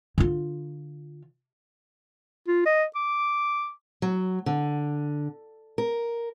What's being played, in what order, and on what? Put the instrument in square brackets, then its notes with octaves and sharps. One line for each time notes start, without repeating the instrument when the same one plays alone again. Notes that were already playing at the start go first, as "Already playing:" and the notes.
[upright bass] D3 F4
[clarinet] F4
D#5
D6
[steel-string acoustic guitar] F#3
D3
A#4